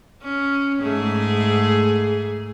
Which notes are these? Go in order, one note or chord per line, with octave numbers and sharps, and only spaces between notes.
C#4
G#2 A3 G#4